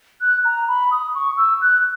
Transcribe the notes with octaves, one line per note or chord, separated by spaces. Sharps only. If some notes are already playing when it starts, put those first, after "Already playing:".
F#6
A#5
B5
D#6
C#6
E6
F#6